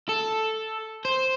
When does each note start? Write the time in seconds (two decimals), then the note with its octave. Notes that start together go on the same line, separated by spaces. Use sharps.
0.09 A4
1.05 C5